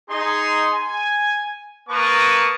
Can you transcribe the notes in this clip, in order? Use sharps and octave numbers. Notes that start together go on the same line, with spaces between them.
D#4 G#4 C6
G#5
A#3 A#4 B4 A5 C#6 D#6